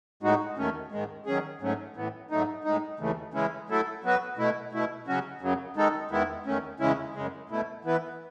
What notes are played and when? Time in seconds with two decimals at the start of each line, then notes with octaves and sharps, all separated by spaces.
0.23 A2 G#3 D#4 F#4
0.57 D#2 D#3 A3 C#4
0.92 G#2 D#3 G#3
1.26 D#3 F#3 C#4 G#4
1.62 G#2 F#3 A3 C#4
1.96 A2 E3 B3
2.31 G#2 F#3 A3 D#4
2.64 A2 G#3 D#4
3.00 D#2 C#3 E3 A3
3.34 C#3 E3 G#3 C#4 E4
3.69 F#3 A3 E4 A4
4.04 F#3 B3 F#4 B4
4.37 B2 A3 E4
4.73 B2 A3 E4
5.07 C#3 F#3 C#4 F#4
5.41 F#2 C#3 F#3
5.76 D#3 G#3 D#4 A4
6.11 E2 D#3 G#3 B3 E4
6.46 E2 D#3 A3 C#4
6.80 E2 C#3 G#3 C#4 E4
7.15 F#2 C#3 G#3
7.49 B2 A3 E4
7.85 E3 B3 E4 B4